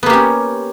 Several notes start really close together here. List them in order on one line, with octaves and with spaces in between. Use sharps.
B3 A#3 G4 C#4